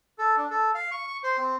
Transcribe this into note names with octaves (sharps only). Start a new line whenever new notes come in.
A4
D4
A4
F5
C#6
C#6
C5
C4